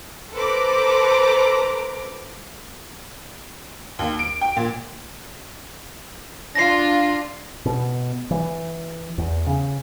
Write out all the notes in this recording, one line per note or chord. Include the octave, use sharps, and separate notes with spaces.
A4 B4 C5 A#5 D6
D#2
D7
G5
A#2
D4 F4 A#6 C7
B2
E3
E2
C#3